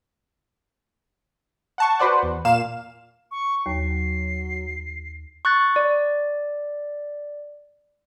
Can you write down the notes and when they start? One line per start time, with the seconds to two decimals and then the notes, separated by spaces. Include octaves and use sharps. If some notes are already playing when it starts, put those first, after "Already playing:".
1.78 F#5 A5 C#6
1.99 F#4 B4 C5 D5 F#5
2.23 E2
2.45 A#2 F5 E7
3.31 C#6
3.66 D#2 F#3 C7
5.45 C#6 F#6 A6
5.76 D5